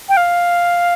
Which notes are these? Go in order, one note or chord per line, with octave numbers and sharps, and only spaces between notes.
G5
F5